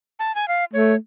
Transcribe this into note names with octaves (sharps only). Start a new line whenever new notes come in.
A5
G#5
F5
A3 C#5